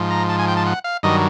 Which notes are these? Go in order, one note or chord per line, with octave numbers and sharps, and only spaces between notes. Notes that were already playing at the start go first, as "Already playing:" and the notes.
Already playing: G#2 F3
A#5
A5
G#5
G5
A5
F#5
F5
G2 D#3 F#3 D#5